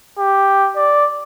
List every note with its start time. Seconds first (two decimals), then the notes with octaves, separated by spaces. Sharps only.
0.19 G4
0.76 D5